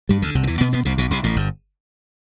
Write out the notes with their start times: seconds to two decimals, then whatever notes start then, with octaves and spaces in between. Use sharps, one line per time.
0.09 G2 G3
0.22 D2 D3
0.35 C2 C3
0.43 D3
0.47 E2 E3
0.61 B2 B3
0.73 B2 B3
0.85 C2 C3
0.98 B1 B2
1.11 C2 C3
1.23 A1 A2
1.36 G1 G2